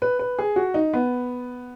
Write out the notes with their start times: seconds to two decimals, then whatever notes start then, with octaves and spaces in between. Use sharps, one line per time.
0.02 B4
0.19 B4
0.39 G#4
0.56 F#4
0.74 D#4
0.94 B3